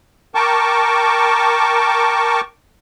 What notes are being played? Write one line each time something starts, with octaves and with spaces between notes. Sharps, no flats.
A#4 G5 A5 C#6 D6